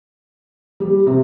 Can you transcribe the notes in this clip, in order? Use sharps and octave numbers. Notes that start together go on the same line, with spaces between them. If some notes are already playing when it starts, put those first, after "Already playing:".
G3 G4
C3 C4